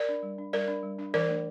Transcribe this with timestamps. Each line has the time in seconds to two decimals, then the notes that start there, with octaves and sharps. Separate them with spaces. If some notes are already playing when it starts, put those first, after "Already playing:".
Already playing: A#4 D5
0.09 D4
0.23 G3
0.38 D4
0.53 G3 A#4 D5
0.68 D4
0.83 G3
0.99 D4
1.14 E3 A#4 D5
1.29 A3 D4